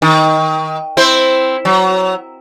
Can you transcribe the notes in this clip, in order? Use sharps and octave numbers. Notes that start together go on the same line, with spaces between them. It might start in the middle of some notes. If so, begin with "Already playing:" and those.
D#3
C4 E4 C5
F#3